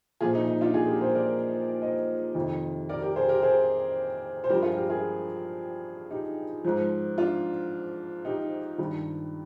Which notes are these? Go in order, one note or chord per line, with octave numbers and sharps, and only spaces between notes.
A#2 F3 F4 G#4
D#4
D#4
D4 F4
F4 G#4
G4 A#4
G#4 C5
A#4 D5
C5 D#5
F2 C3 D#3
A#4 D5
G4 A#4
G#4 C5
G4 A#4
G#4 C5
C5
G2 F3 G4 A#4
F4 G#4
G4 A#4
F4 G#4
D#4 G4
G#2 F3
D4 F4
D#4 G4
G2 D#3